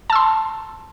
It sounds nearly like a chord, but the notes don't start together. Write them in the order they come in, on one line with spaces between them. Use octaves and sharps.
A5 E6 C6